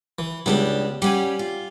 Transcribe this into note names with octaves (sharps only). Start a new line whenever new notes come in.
E3
C#2 G3 B3 D4 E4 G4
G3 C#4 G4 F#5 G#5
F4